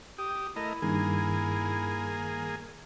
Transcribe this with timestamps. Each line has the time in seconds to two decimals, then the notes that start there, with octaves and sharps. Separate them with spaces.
0.18 G4 D#6
0.56 A3 E4 A#4 D#5
0.82 G2 D#3 A#3 G#4